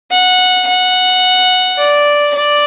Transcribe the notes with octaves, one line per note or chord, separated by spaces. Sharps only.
F#5
F#5
D5
D5